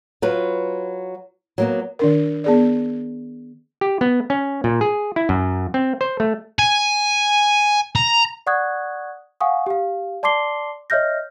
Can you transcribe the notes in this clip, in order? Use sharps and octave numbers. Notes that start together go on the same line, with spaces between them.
F#3 F4 B4
F#3 A#3 B3
D#3 D4 A#4
B3 G#4 D5
G4
B3
C#4
A#2
G#4
E4
F#2
C4
C5
A3
G#5
A#5
D5 F#5 C#6 D#6 F#6 G#6
F5 F#5 G#5 C#6 D#6
G4 F5
D5 A5 C6 D6 C7 G7
C#5 D#5 E5 F6 G6 A#6